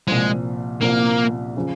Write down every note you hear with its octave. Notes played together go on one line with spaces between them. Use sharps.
C2 A#2 F3 G#3
C2 A#2 F3 A#3
C#3 F3